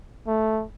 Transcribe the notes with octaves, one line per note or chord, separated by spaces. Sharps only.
A3